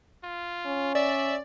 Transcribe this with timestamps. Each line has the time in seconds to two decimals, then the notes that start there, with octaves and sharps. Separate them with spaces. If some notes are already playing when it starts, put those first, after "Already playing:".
0.24 F4
0.66 C#4
0.95 D5 E5